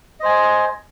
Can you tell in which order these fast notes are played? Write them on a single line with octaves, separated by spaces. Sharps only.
D#5 C5 G#5